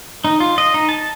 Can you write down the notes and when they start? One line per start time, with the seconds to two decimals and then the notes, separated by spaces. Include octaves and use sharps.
0.24 D#4
0.40 F4
0.58 D#5
0.74 D#4
0.89 A5